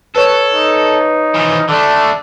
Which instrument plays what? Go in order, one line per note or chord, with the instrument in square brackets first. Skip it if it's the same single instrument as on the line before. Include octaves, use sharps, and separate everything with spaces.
[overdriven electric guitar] A4 [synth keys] B4 C#5
[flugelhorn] D#4
[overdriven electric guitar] E3 F3
[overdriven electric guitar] D3 A3 [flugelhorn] D4